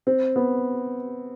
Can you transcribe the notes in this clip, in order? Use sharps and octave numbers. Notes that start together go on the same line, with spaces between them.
C4
B3